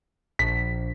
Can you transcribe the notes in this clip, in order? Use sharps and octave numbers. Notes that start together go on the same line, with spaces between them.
A#1 B6